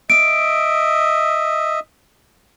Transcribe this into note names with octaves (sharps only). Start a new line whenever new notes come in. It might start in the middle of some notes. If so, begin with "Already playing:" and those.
D#5 E5 D7